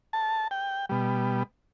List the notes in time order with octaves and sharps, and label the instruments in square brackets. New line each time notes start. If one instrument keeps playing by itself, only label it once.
[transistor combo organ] A5
G5
B2 G3